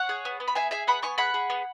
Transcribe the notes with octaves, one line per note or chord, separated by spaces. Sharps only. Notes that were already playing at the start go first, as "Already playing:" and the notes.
Already playing: C#5 F#5
G#4
B3
B3
B5
G#4 E5 G#5
G#4 E5 G#5
B3 F#5 B5
B3 G#5 C#6
G#4 F#5 B5
G#4
B3